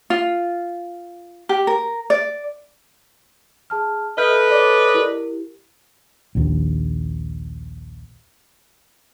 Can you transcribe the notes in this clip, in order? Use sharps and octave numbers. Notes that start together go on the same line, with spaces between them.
F4
G4
A#4
D5
G#4 A5 F6
A4 B4 D#5 E5 F6 G6
C#5 D5
E4 G4 A#4
A#1 D#2